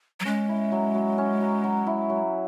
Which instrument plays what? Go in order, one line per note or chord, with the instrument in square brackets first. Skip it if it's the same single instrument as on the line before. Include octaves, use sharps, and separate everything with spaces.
[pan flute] F#3
[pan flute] G#3 [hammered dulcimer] C#4
[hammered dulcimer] E4
F#3
F#3
C#4
F#3
F#3
E4
F#3